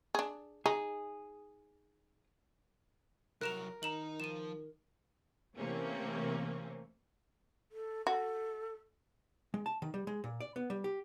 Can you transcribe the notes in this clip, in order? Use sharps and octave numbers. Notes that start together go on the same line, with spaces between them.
D4 G#4
D#4 G#4
C2 F#3 A#4 F#6 E7 F7
D#3 D#4 D#5 A#5 E7 F#7
F3 D#7 E7
C3 E3 A3 A#3 C4 C#4
A4
F#4 A4
G#3
A5
D#3
G3
G#3
A#2
D5
B3
G3
G4